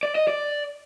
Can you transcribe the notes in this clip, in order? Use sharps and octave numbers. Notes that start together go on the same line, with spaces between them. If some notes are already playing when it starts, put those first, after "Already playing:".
D5
D#5
D5